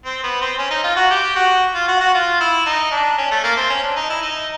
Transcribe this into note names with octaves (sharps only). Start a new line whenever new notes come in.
C4
B3
C4
C#4
D#4
F4
F#4
G4
F#4
F4
F#4
F#4
F4
E4
D#4
D4
C#4
A3
A#3
C4
C#4
D4
D#4
E4
D#4